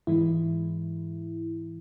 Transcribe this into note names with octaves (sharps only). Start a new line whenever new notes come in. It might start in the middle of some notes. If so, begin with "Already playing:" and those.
G#2 E3 G#3 E4